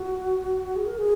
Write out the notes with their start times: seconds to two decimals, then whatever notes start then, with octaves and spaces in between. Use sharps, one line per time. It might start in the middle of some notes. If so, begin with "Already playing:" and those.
Already playing: F#4
0.76 G#4
0.86 A#4
0.98 G#4